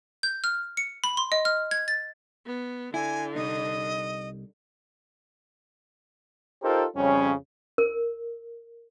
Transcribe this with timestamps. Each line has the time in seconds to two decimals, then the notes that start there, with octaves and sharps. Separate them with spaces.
0.23 G6
0.44 F6
0.77 C#7
1.04 B5
1.17 C6
1.32 D#5
1.45 F6
1.71 G#6
1.88 A6
2.46 B3
2.94 D3 E4 G#5
3.36 C2 D#4 D#5
6.63 D#4 F4 G4 A4 A#4 C5
6.97 F2 C#3 G3 C#4
7.78 A#4